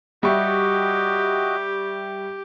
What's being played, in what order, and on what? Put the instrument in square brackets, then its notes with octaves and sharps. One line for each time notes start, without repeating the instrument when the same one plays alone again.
[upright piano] G3 E5 C#6 [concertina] F#4 D#5 [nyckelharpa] G4